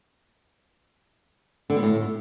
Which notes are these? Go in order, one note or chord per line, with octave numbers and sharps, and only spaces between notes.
D3
B2
A2